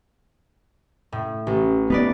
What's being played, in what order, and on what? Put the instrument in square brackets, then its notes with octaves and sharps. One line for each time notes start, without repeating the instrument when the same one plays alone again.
[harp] A2
A1
[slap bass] B3 [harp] D#4 B4 D5